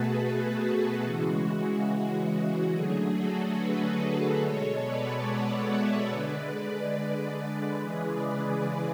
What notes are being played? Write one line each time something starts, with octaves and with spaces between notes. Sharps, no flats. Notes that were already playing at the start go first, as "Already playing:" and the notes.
Already playing: B2 A3 F#4 G#4 A4 B4
G#4
F#4
C#3 E3 G#3
D3 F#3 A3 G#4
F#4 A4
G#4 B4
B2 G#3 A4 C#5
B4 D5
D5 F#5
C#5 E5
D3 G#3 B4 D5
C#3 E3 G#3 G#4 B4
B4 D5